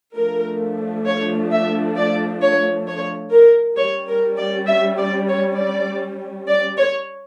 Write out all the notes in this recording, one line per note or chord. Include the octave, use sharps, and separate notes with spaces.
F3 A3 D4 A#4
C#5
E5
D5
C#5
C#5
A#4
G3 C#4 C#5
A#4
D5
E5
D5
C#5
D5
D5
C#5